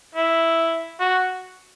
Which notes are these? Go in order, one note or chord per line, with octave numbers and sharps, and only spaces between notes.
E4
F#4